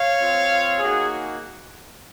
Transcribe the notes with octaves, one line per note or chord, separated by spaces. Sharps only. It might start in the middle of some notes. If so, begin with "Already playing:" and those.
Already playing: C#5 F5
C4 F4
A#3 D#4 F#4 G#4